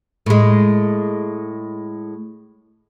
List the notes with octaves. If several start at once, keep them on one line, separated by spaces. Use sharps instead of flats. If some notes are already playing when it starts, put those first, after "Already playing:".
A2 G#3